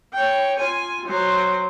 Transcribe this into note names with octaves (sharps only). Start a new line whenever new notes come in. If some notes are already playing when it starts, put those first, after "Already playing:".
C#5 G5
F4 G#5
F#3 C5